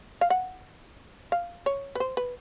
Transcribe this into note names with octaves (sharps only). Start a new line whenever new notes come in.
F5
F#5
F5
C#5
B4
C5
B4